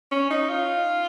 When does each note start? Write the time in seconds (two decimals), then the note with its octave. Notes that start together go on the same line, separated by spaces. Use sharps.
0.11 C#4
0.31 D#4
0.49 F4